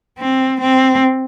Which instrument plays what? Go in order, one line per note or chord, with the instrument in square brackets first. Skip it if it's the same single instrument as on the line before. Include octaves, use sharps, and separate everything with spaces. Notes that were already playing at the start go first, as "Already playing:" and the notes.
[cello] C4
C4